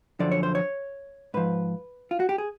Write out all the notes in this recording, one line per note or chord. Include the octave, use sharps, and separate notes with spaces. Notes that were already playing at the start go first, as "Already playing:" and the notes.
F#2 D3 F3 D5
C#5
C5
C#5
G#2 F3 B4
F4
F#4
G4
G#4